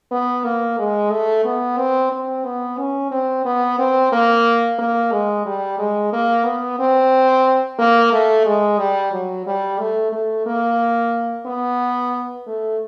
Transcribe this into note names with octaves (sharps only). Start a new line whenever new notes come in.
B3
A#3
G#3
A3
B3
C4
C4
B3
C#4
C4
B3
C4
A#3
A#3
G#3
G3
G#3
A#3
B3
C4
A#3
A3
G#3
G3
F#3
G3
A3
A3
A#3
B3
A3